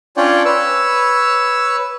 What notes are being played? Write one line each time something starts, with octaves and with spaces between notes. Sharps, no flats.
C#4 D4 F4 C#5 D5 G5
B4 C#5 E6